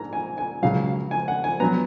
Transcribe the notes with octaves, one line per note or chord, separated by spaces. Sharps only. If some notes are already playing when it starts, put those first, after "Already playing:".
Already playing: G#2 A#3 A#5
G#5
G#5
C#2 C#3 F#3 F5
G#5
F#5
G#5
F#3 B3 A#5